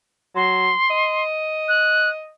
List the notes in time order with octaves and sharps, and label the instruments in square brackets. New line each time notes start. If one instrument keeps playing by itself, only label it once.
[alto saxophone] F#3 [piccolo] C6
[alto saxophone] D#5
[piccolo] F#6